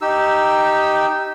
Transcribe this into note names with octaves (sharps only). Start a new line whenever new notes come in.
D#4 G4 E6